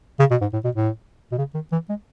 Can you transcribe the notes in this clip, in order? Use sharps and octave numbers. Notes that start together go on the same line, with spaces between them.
C#3
B2
G#2
A2
B2
A2
B2
C#3
D#3
E3
G#3